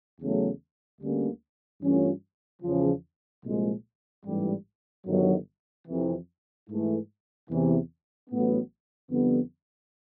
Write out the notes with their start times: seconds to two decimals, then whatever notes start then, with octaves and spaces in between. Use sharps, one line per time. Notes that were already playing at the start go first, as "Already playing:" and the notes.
0.19 E2 C#3 F#3 A3
1.00 D2 D3 G3 A#3 C#4
1.82 G2 E3 A3 C#4 F4
2.62 E2 C#3 F3
3.44 C2 A#2 F3 G#3
4.24 A1 G#2 E3 G3
5.06 G1 G2 D#3 F#3
5.87 F2 C3 E3
6.68 G#2 E3 A3
7.49 E2 C3 E3
8.30 A1 A2 F#3 B3
9.10 F2 D3 G3 B3